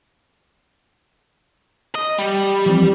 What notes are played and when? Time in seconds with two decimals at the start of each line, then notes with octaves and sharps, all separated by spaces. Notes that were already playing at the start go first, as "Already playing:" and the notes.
1.95 D#5
2.18 G3
2.66 E3 F3 C4